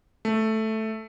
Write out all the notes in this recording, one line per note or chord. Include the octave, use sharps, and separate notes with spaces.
A3